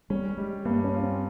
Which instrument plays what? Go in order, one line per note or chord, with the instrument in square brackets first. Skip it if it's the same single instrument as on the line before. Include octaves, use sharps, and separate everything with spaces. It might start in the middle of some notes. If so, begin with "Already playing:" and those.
[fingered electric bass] G3 [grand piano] C#4
[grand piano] G3 [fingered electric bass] G#3
[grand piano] G2 [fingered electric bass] A#3
[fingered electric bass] C#4
[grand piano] F4
[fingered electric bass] C4